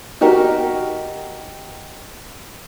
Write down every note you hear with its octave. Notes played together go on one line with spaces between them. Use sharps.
D#4 F#4 G4 A#4